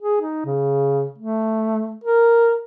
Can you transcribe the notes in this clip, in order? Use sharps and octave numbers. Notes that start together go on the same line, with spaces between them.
G#4
D#4
C#3
A3
A#4